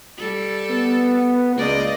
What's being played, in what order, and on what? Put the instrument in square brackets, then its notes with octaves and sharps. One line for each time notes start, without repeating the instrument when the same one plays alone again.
[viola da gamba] G3 A4
[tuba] B3
[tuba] C#2 [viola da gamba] A#3 D5 D#5